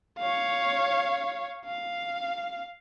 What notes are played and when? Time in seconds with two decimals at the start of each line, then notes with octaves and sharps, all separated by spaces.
0.19 C#5 F5
1.65 F5